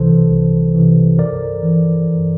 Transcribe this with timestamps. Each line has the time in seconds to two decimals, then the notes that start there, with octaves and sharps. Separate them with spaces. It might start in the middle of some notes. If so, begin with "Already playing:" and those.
Already playing: C2 C3 E3 A4 C5
0.30 C2
0.75 C3 E3
1.19 G2 A#4 D5
1.63 E3
2.08 G2